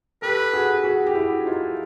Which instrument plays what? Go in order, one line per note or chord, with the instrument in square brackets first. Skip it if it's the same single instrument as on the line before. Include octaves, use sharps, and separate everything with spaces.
[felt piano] G4 A4 [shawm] B4
[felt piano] F#4 G#4
F#4 G#4
G4
E4 F#4
D#4 F4